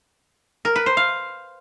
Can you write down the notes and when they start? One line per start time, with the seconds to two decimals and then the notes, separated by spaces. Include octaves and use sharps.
0.65 A#4
0.76 B4
0.86 C5
0.97 F5